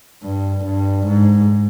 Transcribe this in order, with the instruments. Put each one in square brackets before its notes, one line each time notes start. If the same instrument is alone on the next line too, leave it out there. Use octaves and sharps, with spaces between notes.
[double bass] G2
G2
G#2